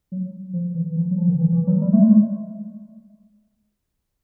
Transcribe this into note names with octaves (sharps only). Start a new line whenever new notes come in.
F#3
F3
E3
F3
F#3
F3
D#3
E3
E3
F#3
G3
A3
G#3